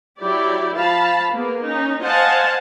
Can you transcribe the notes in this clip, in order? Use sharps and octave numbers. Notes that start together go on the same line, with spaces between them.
F#3 E4 G4 D5
F3 F5 A5 B5
A#3 B3 G#4
C#4 D#4
C5 D#5 F5 F#5 G#5 A5